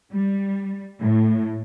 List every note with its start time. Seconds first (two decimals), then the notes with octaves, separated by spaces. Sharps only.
0.12 G3
1.02 A2